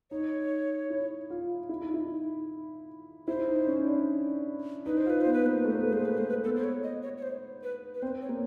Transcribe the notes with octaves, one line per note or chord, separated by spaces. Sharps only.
D#4 C#5
E4
F4
E4
D#4
E4
E4 C5
D#4
C#4
D4
D#4 B4
C5
F4 B4
B3 C5
B4
A#3 C5
B4
A3 C5
A#3
A3 B4
G#3 C5
B4
A3 C5
B4
B3 A4
C5
C#5
D#5
C#5
C#5
C5
B4
B4
C4 C5
C#5
A#3